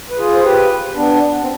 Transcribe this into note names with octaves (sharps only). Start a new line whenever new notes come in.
B4
F4 G#4
C5
G4 B4
B3 D4
C4